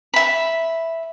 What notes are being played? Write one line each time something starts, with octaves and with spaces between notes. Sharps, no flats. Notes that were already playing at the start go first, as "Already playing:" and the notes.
E5 B5